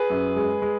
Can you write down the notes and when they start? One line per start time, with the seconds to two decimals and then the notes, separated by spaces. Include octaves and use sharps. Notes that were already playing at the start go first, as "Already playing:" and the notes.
Already playing: G#4 B4
0.10 F#2
0.36 G#3
0.62 G#3